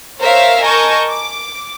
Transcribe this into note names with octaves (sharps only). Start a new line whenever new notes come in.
A#4 C5 C#5 E5 F5
A#4 D#5 G#5 A5 C#6 G6
D6